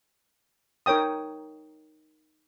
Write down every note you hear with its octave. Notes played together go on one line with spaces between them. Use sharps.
D#4 A#4 C#5 G5 D#6